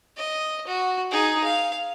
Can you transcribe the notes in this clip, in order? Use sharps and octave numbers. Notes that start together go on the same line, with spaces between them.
D#5
F#4
D#4 G#4
F5